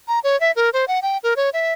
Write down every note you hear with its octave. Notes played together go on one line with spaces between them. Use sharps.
A#5
C#5
E5
A#4
C5
F#5
G5
A#4
C#5
E5